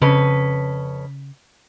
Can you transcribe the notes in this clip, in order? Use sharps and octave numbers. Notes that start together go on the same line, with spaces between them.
F2 C#3 C#4 B4